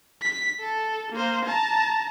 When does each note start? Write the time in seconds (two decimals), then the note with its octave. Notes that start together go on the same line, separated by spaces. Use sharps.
0.22 B6
0.60 A4
1.13 A#3 C5
1.46 A5 A#5